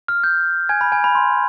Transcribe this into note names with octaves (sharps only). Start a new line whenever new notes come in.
F6
G6
G#5 G#6
B5
G#5
B5
C6